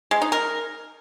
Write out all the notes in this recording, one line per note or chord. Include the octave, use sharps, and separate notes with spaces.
G#3
D#4
A#4